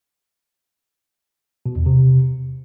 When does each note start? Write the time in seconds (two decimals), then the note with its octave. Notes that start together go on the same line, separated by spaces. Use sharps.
1.66 B2
1.76 E2
1.86 C3